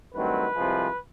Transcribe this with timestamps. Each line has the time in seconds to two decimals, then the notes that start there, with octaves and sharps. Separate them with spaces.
0.15 G2 D#3 F#3 A3 C4 B4
0.55 C2 C3 F3 G#3